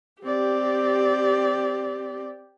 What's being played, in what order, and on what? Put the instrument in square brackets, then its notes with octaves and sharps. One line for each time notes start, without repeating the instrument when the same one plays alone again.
[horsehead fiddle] C4 D5 [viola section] G4